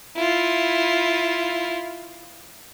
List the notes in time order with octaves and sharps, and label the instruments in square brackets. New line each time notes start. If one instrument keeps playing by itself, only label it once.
[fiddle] E4 F4